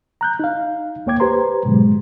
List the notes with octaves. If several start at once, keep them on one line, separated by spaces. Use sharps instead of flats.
A#5 F#6 G6
D#4 F5
D2 A#3 C#5 G5 D6 G#6
G4 B4 C5 A#5 C6
G#2 B2 D3 F#3 G#3